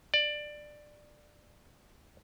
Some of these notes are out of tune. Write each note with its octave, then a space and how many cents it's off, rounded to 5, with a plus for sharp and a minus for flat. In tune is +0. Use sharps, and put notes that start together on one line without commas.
D5 +15